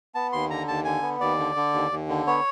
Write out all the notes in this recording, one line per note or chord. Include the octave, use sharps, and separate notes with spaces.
B3 A5
D#2 C6
D3 A#5
D#2 A5
D3 G#5
B3
D#2 D5
D3
D3
D#2
D#2
D3
B3 C#5